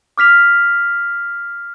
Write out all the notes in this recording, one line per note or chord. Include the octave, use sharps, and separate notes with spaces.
D6 F6 B6 F7